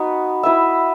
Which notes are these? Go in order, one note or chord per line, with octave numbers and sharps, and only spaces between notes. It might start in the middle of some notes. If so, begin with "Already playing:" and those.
Already playing: B3 D#4 F#4 B4
E4 B4 E5